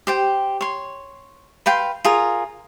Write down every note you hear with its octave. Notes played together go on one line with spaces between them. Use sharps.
G4 C5 G5
C#5 C6
B4 F5 G5 C6
F4 G#4 A#4